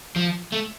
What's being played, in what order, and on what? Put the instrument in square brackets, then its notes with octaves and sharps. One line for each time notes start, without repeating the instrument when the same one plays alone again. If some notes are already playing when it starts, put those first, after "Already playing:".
[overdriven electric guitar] F3
A3